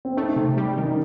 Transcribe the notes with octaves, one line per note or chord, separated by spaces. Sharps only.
C4
A3 D#4
C3
G3
D#3
D#4